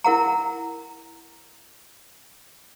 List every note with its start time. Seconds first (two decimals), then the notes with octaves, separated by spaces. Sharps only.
0.04 E4 A#4 F#5 A#5